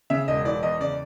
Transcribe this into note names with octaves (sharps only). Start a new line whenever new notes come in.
C#3 E5
E1 D#5
E3 D5
E2 D#5
C#3 D5